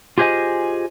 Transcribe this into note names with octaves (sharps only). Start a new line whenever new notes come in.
F4 G4 G#4 C5 D#5 G#5